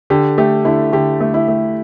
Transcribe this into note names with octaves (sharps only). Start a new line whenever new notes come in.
D3 G4
A3 G4
D3 E4
D3 G4
A3
E4
A3